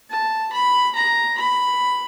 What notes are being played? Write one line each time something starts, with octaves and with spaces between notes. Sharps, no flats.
A5
B5
A#5
B5